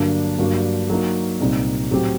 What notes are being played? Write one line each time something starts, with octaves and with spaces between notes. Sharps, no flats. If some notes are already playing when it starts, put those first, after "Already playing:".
Already playing: G2 D3 F#3 A#3 D4
G2 F#3 A#3 D4 F#4
F#3 A#3 D#4
C2 A#2 G3 C4 D#4
A2 F#3 C4 G4